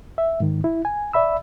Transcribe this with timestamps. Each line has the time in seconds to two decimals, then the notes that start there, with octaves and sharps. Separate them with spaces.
0.18 E5
0.40 G#2 D#3
0.64 E4
0.85 G#5
1.13 D5 E5 B5 E6